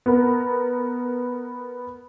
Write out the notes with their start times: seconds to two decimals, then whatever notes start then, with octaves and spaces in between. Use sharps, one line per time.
0.06 B3 A#4